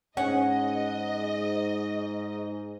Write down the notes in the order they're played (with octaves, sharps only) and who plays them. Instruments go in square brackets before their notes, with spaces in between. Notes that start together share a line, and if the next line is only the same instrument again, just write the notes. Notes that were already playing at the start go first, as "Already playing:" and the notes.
[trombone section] G#2 [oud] C#4 [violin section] D#5 [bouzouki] F#5